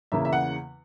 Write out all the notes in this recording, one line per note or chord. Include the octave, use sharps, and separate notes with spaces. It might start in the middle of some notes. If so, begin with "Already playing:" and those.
E2 C#3 E3 A#3 E5
E5
F#5